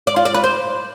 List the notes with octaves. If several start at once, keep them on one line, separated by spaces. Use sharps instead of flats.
D5
F4
D5
B4
C5